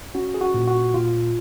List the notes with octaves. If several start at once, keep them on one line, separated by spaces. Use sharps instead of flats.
C#4 F#4
G#4
F#4
A#2
F#4
A#2 F4